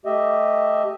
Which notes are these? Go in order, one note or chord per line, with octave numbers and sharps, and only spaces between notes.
A3 G4 D#5 E5